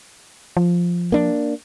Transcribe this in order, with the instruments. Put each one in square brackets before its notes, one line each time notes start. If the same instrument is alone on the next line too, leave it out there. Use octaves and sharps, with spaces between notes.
[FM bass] F3
[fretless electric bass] A#3 D4